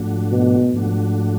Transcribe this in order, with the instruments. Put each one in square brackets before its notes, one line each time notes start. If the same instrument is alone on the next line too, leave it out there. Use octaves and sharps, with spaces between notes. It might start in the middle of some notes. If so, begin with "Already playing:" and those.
Already playing: [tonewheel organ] G#2 F3 A3 D4 F#4
[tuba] B2
[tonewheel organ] G#2 F3 A3 D4 F#4